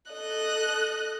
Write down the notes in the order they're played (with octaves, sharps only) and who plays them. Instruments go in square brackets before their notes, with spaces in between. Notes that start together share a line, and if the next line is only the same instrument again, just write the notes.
[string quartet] A4 D#5 F#6